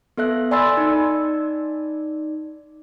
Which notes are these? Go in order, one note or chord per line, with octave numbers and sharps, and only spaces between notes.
B3 A4 E5 F#6
D5 G#5 B5 C6 E6 A6
D#4 D5